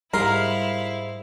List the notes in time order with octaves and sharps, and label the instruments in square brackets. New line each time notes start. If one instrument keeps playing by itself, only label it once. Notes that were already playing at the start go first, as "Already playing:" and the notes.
[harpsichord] G#2 C6 [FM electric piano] G3 [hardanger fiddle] E4 F5 [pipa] A#4